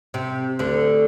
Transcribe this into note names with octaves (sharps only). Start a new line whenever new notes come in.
C3
D2 D3